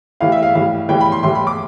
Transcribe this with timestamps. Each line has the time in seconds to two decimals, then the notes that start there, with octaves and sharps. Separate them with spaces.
0.20 A2 E3 G3 F5
0.32 E5
0.43 F5
0.55 A2 E3 G3 F5
0.89 A2 E3 G3 G5
1.01 B5
1.12 C6
1.23 A2 E3 G3 C6
1.35 B5
1.47 D6